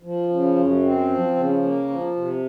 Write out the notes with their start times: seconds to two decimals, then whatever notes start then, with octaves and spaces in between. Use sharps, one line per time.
0.03 F3
0.29 C#3
0.56 F#2
0.82 C4
1.09 F3
1.36 C#3
1.62 A#3
1.89 F3
2.16 C3